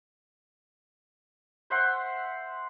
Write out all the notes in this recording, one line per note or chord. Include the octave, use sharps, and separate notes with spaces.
C5 E5 F#5 C6